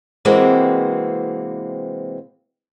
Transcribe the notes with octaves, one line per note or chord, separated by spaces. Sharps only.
C3 E3 G#3 A#3 C4 F#4